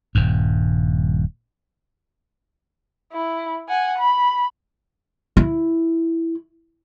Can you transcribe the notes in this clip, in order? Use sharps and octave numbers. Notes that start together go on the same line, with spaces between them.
D#1 G2
E4
F#5 G#5
B5
E4